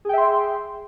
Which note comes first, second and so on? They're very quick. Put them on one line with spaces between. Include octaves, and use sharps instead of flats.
G#4 G5 E5 C6